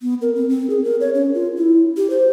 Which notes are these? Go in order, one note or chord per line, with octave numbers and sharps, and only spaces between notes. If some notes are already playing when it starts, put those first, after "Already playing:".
B3
A#4
C4
C4
G#4
A#4
C#5
C#4
F4
E4
G4
C5